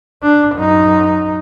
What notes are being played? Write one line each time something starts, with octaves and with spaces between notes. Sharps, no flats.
D4
F#2 D#4